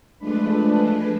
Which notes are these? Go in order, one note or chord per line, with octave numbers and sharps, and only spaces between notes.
F3 G#3 A3 D4 B4